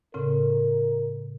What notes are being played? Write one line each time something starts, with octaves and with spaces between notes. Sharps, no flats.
A2 C#3 C4 A#4